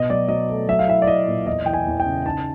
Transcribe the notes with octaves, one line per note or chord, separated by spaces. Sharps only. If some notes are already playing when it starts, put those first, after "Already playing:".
Already playing: B2 D#5
F#3 D5
F#3 D#5
A3
F#3 E5
F5
E4 E5
D5
E4 D#5
A#2
E2 D#5
E3 G5
G#5
E2
G5
C#3
D#4 A5